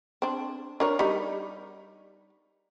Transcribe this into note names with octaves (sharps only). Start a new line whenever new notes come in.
C4 D4
D4 A#4 C#5
G3 D#4